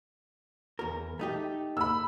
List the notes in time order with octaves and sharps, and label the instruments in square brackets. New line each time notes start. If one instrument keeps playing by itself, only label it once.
[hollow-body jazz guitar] E2 A#4
A3 D#4 G4
[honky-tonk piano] B5 E6